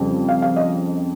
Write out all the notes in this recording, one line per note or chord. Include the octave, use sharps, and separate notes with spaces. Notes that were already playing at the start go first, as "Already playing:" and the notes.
Already playing: F2 C#3 G3
F5
F5
D#5